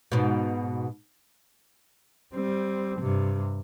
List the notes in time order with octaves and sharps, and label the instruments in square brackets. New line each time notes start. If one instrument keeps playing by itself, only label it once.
[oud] G#2 B2
[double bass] G3 C4
G2 C3